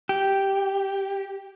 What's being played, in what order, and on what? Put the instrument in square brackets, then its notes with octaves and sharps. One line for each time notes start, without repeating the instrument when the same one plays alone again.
[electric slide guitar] G4